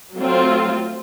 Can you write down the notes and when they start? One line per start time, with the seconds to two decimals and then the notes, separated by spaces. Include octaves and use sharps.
0.15 F#3 A3 C4 F4